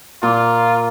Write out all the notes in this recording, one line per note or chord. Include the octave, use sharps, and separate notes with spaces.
A#2 F4